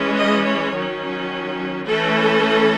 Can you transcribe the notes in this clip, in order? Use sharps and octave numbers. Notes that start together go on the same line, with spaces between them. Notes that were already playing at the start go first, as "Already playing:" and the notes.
Already playing: E3 G#3 C#4
D#5
C#5
D#3 F#3 C#4
E3 A3 C#4 A4